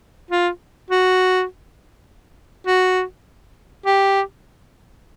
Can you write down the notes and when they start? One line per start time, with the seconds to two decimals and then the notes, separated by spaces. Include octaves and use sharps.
0.31 F4
0.90 F#4
2.67 F#4
3.86 G4